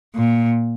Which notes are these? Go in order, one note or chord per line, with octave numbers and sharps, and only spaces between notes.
A#2